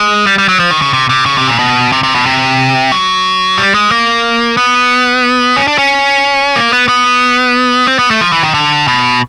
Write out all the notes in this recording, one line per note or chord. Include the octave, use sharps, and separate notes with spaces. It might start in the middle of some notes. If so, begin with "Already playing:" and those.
Already playing: G#3
G3
G3
F#3
F3
D#3
C#3
C3
C3
C#3
C3
A#2
B2
C3
C3
B2
C3
F#3
G3
G#3
A#3
B3
C#4
D4
C#4
A#3
B3
B3
C4
B3
A3
F3
E3
D#3
D3
B2